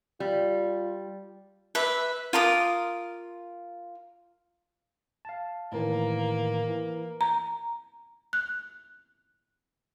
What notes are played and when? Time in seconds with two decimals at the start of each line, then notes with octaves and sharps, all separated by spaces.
0.20 G3 F4
1.75 B4 E5
2.33 F4 A#4 D#6
5.25 F5 A5
5.72 A2 D#3 E3 A#3
6.68 E3
7.21 A#5
8.33 F#6